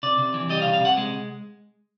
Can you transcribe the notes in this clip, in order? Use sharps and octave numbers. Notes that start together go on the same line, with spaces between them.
C3 D5
C3
E3
G3 D#5
F5
C3
F5
C3 F#5
G#3